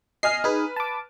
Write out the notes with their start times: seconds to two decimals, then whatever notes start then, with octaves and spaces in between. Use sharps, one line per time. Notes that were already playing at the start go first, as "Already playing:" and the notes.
0.23 D#5 G#5 F6 C7
0.44 D#4 G#4 B4
0.76 A5 D6